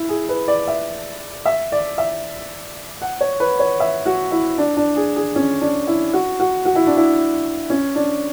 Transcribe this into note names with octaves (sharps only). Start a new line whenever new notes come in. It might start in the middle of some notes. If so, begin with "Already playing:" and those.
Already playing: E4
G#4
B4
D5
E5
E5
D5
E5
F#5
C#5
B4
C#5
E5
F#4
E4
D4
D4
G#4
G#4
C#4
D4
E4
F#4
F#4
F#4
E4
D4
E4
C#4
D4